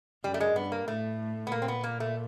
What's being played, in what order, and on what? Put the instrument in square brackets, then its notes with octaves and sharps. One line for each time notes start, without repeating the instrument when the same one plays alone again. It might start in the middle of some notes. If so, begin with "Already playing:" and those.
[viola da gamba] F#2 [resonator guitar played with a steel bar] G3
[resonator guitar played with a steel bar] A3
G#3
[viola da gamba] G2 [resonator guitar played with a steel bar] B3
[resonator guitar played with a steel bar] A#3
[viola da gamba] A2 [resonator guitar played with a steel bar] A3
[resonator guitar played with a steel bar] B3
[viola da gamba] A#2 [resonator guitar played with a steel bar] A#3
[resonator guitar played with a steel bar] C4
B3
A#3
A3